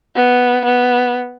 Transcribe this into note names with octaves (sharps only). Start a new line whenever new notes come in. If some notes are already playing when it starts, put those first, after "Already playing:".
B3
B3